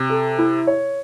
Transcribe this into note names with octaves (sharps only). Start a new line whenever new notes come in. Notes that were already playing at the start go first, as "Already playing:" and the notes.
Already playing: C3
A4
E4
C#5